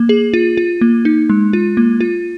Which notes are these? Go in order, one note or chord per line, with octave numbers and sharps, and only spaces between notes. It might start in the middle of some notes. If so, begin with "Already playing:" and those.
Already playing: A#3
G#4
F4
F4
A#3
D#4
G#3
F4
A#3
F4